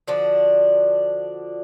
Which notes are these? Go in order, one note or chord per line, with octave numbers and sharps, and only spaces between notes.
D3 F3 D4 F#4